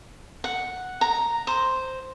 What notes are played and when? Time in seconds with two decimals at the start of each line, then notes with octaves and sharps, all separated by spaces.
0.44 F#5
1.01 A#5
1.47 C5